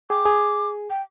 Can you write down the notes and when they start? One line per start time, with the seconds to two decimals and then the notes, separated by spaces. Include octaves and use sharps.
0.10 G#4 G5 D6
0.25 G#4
0.90 G5